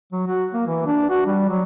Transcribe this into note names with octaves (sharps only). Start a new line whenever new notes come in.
F#3
F#4
A#3
E3
D4
F#4
G3
F#3